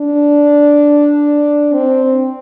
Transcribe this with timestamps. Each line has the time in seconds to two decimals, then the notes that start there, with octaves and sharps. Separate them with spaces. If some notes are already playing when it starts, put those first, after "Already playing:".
Already playing: D4
1.73 C4